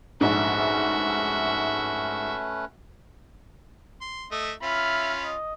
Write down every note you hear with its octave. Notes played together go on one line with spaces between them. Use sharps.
A#1 G#2 A3 C#4 F#4 B4 E5
C6
A3 D#5 E5
C#4 F4 E5 B5 F6
D#5